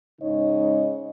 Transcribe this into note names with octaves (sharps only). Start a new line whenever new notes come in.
G#2 C#3 D#4 C#5 D#5